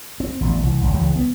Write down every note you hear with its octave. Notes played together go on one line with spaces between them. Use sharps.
C4
A1 B2 D3
C2 E3
G#1 C#2
C#2 E3 G#3
B3